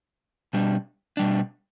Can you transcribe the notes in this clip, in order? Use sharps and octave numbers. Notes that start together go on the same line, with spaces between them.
B2 G3 D4
B2 G3 D4